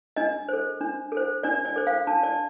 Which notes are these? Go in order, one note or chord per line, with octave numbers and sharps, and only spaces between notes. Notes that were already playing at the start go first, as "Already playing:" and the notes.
D4 D#5
A4 C5
D4
A4 C5
D4 D5
D5
A4 C5
F5
D4 A5
D5